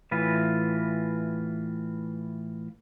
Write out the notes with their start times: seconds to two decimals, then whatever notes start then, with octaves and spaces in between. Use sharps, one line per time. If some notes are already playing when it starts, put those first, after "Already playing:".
0.11 A2 E3 F4 B4